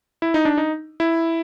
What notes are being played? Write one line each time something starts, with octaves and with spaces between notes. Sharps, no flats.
E4
D#4
D4
D#4
E4